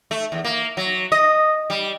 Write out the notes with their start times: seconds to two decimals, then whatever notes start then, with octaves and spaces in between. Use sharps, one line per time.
0.11 A3
0.32 E2
0.44 A#3
0.77 F#3
1.12 D#5
1.70 G3